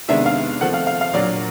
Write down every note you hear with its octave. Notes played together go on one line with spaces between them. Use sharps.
C3 D#3 G#3 B3 D4 E5
F5
F3 A3 C4 F#5
F5
F5
F5
A#2 F#3 A#3 D4 D5